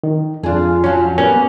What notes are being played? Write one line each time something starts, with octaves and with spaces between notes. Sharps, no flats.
D#3
F2 D4 F4 G#4
F3 F#3 C#4
G3 A#3 B3 C#4